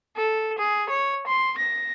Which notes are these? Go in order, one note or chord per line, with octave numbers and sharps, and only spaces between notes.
A4
G#4
C#5
C6
A#6